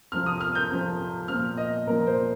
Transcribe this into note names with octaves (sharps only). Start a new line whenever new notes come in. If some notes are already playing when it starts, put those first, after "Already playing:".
F2 C3 F3 F6
D#6
F6
G6
F2 C3 F3
A#2 F3 F6
D#5
A#2 F3 A#4
C5